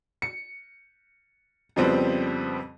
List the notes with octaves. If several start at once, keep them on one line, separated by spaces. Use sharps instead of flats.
C#7
F2 C#3 F3 G3 B3 C4